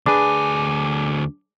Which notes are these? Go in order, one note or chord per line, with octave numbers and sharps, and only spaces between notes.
D2 D4 G#4 B4 G#5 D6